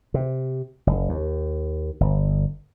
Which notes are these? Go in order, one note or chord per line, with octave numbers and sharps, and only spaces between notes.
C3
F#1
D#2
G1